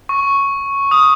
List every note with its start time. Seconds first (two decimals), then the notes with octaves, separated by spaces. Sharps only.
0.09 C#6
0.91 D#6